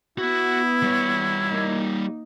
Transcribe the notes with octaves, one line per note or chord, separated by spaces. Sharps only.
B3 E4 F#4
G3 C#5
A#3 D#4